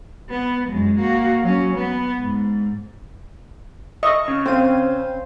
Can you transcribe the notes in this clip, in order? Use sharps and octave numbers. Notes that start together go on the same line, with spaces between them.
B3
F#2 G#3
A#3 F#4
F#3 C#4
B3
G#2
D#5 E5 C#6
C#3
C4 C5 F5 C6 D#7